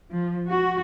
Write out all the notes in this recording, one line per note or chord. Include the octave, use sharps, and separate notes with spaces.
F3
F#4